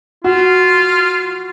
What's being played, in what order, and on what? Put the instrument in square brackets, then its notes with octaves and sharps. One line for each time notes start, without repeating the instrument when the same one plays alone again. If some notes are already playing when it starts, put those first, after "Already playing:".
[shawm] F4 [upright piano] F#4